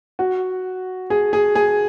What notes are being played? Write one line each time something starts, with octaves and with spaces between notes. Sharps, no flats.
F#4
G#4
G#4
G#4